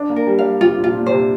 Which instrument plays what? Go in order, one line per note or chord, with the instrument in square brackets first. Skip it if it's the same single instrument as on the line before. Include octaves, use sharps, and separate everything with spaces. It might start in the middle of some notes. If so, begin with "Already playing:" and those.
Already playing: [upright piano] D4
A#3
[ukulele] A#4
[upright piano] G3
[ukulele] F5
[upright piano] C3 [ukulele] F4
[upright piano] A#2
[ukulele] F4
[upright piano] A#2
[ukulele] C5
[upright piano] C3